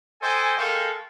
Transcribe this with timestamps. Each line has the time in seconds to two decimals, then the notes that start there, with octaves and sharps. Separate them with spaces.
0.22 A4 C5 D#5 G5 G#5
0.57 G#3 A4 A#4 F5 G5 C#6